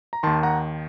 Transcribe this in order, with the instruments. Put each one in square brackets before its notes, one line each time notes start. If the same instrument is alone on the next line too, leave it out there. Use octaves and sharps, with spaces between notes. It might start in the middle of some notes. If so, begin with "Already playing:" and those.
[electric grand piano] A#5
D#2 D#3 A5 C6
F#5 A#5